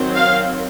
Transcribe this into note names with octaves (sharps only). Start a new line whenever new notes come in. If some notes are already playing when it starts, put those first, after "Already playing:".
Already playing: D#3 F#3 C4
F5